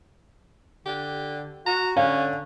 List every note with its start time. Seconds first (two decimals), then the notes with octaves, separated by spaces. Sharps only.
0.86 D3 G4
1.66 F#4 A#5
1.96 D3 C#4 F5